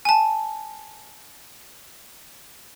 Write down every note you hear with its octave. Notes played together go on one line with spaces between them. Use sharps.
G#5 A5